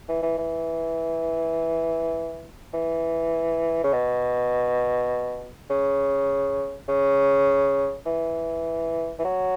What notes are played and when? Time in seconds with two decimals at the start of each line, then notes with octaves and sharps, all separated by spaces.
0.08 E3
0.22 E3
0.38 E3
2.73 E3
3.84 C#3
3.93 B2
5.70 C#3
6.88 C#3
8.06 E3
9.19 E3
9.24 F#3